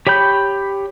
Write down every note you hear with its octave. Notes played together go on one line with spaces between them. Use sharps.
G4 C#5 G5 B5 G6